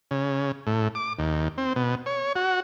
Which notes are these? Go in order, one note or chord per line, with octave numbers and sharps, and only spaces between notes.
C#3
A2
D6
D#2
C4
B2
C#5
F#4